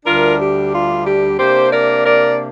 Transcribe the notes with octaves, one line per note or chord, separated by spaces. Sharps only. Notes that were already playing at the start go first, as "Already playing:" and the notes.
D2 D3 G3 D4 F4 A#4
G4
F4
G4
C3 A#3 D4 G4 C5
A#4 D5
A#4 D5